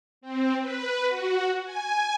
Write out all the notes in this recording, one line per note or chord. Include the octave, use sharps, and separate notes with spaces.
C4
B4
F#4
G#5